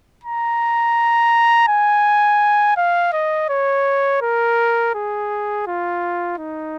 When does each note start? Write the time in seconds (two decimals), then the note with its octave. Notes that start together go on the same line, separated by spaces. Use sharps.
0.24 A#5
1.68 G#5
2.77 F5
3.13 D#5
3.49 C#5
4.22 A#4
4.94 G#4
5.67 F4
6.38 D#4